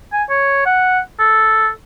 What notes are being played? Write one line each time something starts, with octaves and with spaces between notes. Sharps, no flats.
G#5
C#5
F#5
A4